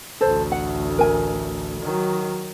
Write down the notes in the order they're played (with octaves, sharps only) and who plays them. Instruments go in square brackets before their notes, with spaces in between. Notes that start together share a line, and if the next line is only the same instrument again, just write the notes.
[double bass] A1 D2 [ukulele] A4 C5
[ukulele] F#5
A#4 G#5
[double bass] D#3 F#3